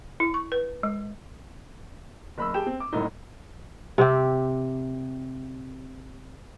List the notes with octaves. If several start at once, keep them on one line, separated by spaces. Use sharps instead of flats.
E4
C#6
B4
G#3
F#1 B5 E6
G4 G#4 G5 A5 E7
C4
D6
F#1 C2 A2 D#4
C3 C4 G4